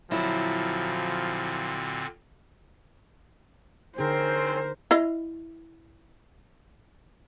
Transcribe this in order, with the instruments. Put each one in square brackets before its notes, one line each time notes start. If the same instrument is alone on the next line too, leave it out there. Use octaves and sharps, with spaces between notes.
[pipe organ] A#2 D3 C4 [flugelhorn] F3 [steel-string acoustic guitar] F#3 E4
[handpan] D3 D#4 G#4 [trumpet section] C4 C#4 G5 [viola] A#4 [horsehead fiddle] C5
[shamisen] E4 D#5 F5